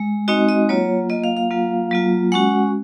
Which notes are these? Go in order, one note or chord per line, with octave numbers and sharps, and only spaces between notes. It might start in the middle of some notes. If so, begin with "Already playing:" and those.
Already playing: G#3
G#3 C4 D#4 F#4 D#5
D#5
F#3 A#3 F4 C#5
F#3 A#3 F4 D#5
F5
F5
F#3 A#3 F4
F#3 A#3 F4
G#3 C#4 F#4 F#5